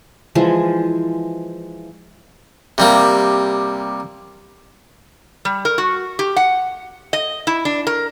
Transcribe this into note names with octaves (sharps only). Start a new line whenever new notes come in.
E3 F3 G#3
C3 G3 A#3
G3
A#4
F#4
G4
F#5
D#5
E4
D4
A#4